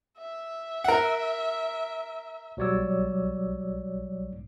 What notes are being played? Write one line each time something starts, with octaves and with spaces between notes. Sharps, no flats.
E5
A#4 F#5
B1 F#3 G3 C#5 D5 E6